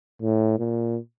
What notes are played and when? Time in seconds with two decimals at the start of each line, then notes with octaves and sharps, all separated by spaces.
0.22 A2
0.59 A#2